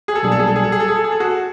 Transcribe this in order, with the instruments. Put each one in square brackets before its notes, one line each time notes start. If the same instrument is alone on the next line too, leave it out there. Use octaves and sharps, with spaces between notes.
[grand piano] G#4
A4
[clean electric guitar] B1 B2 G3 A#3 D4 [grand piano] G#4
[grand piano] A4
G#4
A4
G#4
A4
G#4
A4
G#4
A4
G#4
A4
F#4 G#4